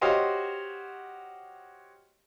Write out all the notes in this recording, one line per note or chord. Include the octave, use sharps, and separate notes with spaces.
F#4 G4 C5 C#5 D#5 F5